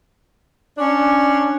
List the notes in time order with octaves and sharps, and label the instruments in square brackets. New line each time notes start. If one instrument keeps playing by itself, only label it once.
[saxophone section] C#4 D4